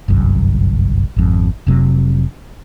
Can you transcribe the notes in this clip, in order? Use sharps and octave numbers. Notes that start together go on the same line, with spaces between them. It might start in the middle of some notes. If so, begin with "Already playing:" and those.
G1 C2 F#2
G#1 F2
F1 C3 F#3